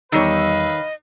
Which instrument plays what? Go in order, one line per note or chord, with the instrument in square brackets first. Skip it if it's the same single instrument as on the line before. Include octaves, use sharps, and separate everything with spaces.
[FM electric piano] E2 G3 E6 [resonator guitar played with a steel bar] D#3 C#5 [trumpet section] B4 F5 [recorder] D#5